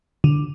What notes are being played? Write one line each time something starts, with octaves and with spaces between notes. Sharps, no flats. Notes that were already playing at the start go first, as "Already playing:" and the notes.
D3